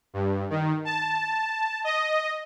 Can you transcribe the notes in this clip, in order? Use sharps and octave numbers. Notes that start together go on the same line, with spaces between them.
G2
D#3
A5
D#5